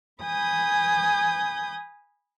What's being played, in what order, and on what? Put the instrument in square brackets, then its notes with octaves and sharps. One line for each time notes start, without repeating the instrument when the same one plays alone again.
[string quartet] G#5 B5 D#6 G6